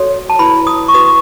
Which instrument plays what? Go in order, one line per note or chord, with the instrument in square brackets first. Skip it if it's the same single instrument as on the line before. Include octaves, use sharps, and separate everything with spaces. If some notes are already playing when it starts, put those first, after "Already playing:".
Already playing: [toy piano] F#4 A4 C#5
A5
E4 B4 B5
D#6
C#6
F#4 B4 D#6